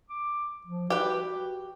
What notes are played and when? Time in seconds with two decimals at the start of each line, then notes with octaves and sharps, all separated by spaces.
0.10 D6
0.67 F3
0.90 F#4 G4 B4